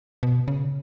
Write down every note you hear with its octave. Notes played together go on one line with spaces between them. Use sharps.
B2
C#3